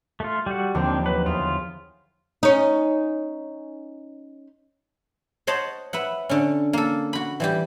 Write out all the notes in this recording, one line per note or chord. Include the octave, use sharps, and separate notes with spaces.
A3 F4
G3 F#4
D#2 D3 F3 C4 D4
F#3 B4
E2 F4
C#4 D#4
C5 C#5 D#5 F#5 A5
B4 E5 F#5
D3 C#4
A#3 A4
F#4 B5
E3 G3 G4